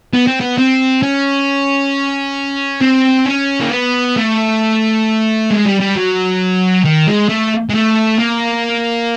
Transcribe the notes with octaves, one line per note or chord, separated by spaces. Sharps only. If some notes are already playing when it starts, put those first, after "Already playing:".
B3
C4
B3
C4
C#4
C4
C#4
A#3
B3
A3
G#3
G3
G3
F#3
D#3
G#3
A3
G#3
A3
A#3